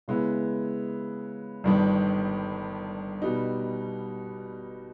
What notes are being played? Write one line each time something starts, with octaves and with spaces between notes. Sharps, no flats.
C#3 G#3 B3 E4
G1 G2 D#3
B2 G3 B3 D#4